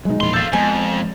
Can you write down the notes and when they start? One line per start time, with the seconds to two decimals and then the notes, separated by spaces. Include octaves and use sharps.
0.05 B2 F#3 G#3 D#4
0.21 E1 A#2 F3 E4 C6
0.34 A4 F5 G6 A6
0.53 F2 F3 G#3 B3 G#5